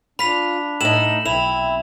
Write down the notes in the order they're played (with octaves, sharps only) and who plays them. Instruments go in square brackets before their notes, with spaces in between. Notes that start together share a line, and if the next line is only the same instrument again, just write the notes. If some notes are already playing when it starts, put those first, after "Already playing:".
[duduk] D4 [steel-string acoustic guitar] F4 [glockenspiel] B5 B6 F7
[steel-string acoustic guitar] A2 D#4 [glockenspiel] E7 F#7
[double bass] B1 [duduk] C4 [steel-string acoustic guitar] E4 [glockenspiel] F7